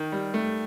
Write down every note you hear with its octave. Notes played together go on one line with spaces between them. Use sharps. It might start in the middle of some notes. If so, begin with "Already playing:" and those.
Already playing: D#3
G3
A3